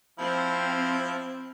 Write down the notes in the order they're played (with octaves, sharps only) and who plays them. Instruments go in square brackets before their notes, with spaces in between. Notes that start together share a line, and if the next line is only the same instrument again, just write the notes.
[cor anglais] F3 [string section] C4 [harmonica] E4